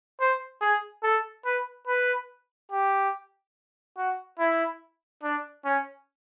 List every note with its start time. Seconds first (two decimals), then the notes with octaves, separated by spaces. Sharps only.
0.20 C5
0.61 G#4
1.03 A4
1.45 B4
1.87 B4
2.71 G4
3.97 F#4
4.39 E4
5.23 D4
5.65 C#4